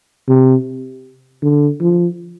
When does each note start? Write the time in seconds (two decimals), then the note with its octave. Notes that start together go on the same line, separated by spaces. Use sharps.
0.28 C3
1.42 D3
1.81 F3